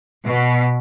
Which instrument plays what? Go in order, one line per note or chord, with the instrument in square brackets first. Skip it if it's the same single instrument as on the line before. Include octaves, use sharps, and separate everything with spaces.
[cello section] B2